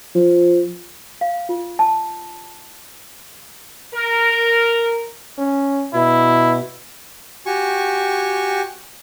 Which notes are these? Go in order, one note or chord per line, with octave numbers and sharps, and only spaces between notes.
F3
F5
F4
A5
A#4
C#4
B2 E4
F#4 G4 G#5 C#6